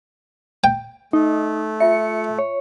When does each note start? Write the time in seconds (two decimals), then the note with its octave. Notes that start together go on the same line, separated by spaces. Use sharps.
0.64 G5
1.13 A3 D#4
1.80 F4 E5 C#7
2.39 C#5